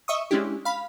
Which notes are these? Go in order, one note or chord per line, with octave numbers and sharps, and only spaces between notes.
D#5 E5 C#6 D#6
G#3 C#4 D4 E4 G4
F5 B5